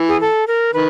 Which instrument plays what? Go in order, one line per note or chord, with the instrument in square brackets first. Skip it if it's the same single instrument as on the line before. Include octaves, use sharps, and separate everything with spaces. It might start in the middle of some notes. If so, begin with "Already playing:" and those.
Already playing: [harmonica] E3
[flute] G#4
A4
A#4
[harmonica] D#3 [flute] B4